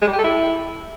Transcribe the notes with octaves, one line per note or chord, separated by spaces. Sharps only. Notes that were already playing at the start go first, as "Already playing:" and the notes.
G#3
G3
G4
A4
E4